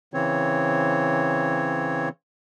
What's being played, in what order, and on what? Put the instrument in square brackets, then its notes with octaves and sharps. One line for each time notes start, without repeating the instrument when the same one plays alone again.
[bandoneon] C#3 E3 C4 C#5